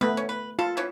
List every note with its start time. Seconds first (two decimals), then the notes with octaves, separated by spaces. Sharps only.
0.01 A3 B3 B4
0.17 C#4
0.29 B4
0.59 F4 A4
0.77 E3 B3 C#4